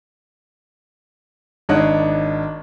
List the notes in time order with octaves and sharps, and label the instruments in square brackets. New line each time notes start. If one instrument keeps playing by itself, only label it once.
[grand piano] G#1 D4 C#5 D#5 F#6